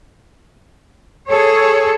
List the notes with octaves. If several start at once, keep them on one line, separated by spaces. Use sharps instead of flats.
G#4 A4 C#5